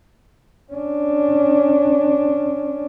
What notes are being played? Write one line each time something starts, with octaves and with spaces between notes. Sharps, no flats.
C#4 D4